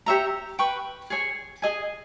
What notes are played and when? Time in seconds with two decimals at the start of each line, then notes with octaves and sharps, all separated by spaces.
0.06 G4 C#5 E5 A#5
0.59 B4 G5 C#6
1.10 G#4 C#5 G#5
1.62 G#4 D#5 G#5